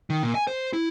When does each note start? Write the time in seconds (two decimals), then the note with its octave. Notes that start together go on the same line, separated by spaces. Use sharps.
0.10 D#3
0.23 A#2
0.35 G#5
0.47 C5
0.73 E4